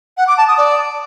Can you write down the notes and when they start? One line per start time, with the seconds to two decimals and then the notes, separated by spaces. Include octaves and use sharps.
0.17 F#5
0.27 D6
0.38 A5
0.48 D#6
0.58 D5